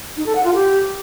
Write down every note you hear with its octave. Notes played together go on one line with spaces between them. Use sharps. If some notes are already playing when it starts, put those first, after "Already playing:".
D#4
A4
F#5
F4
G4